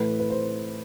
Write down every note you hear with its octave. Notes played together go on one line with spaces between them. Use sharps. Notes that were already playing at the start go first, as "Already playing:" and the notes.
Already playing: A2 E3 A3 B4
B4
C5